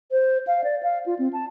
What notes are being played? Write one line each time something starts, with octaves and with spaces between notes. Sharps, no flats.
C5
F5
D5
F5
F4
C4
A5